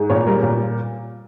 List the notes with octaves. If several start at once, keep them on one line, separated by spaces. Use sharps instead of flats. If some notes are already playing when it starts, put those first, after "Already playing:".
Already playing: G#2
A#2 C#5
G3 A#4
A#2